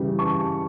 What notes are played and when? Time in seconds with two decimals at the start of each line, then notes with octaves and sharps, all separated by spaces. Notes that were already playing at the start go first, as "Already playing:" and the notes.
Already playing: C#3 E3 G3
0.19 A5 C#6